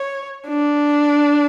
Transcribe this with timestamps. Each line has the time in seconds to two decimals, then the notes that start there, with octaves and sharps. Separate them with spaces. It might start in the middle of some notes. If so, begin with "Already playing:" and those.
Already playing: C#5
0.48 D4